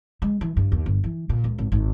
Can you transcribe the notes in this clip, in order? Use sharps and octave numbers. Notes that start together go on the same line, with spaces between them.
G#3
E3
G2
D#2
G1
E3
A#2
C#2
G#1
G#1